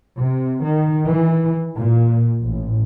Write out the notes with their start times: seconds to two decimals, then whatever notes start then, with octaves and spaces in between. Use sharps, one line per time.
0.19 C3
0.63 D#3
1.07 E3
1.77 A#2
2.41 A1